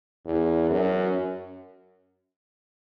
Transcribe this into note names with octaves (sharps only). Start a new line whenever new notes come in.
E2
F#2